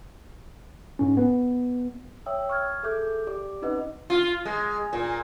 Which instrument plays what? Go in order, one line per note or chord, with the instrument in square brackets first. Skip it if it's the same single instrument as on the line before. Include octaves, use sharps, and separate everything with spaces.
[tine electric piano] G#2 C#4
B3
[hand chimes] C#5 E5 G5 D#6 E6
C#6 F6 G#6
G#4 A4 E5 D6 G6
G4 D5 D6
C4 C#4 D#4 B4 D#5 F#5
[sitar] F4
G#3
A#2